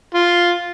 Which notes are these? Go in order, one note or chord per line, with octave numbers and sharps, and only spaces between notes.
F4